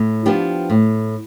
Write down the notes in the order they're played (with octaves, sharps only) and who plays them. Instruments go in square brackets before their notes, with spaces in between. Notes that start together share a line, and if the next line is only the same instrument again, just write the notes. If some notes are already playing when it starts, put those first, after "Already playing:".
Already playing: [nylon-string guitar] A2
F3 B3 D4 G4
A2